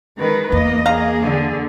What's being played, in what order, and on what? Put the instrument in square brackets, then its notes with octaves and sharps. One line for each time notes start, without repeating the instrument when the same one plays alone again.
[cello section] D#3 [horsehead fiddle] G#3 B4
[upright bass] E2 [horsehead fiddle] A#3 [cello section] D#5
[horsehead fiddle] A#3 G#4 [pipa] F5 A#5
[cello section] D3